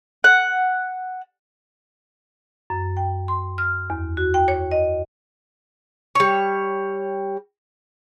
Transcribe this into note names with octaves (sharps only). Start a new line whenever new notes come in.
F#5
F#2
G5
C6
F6
E2
F#4
G5
C#5
D#5
G3 C#5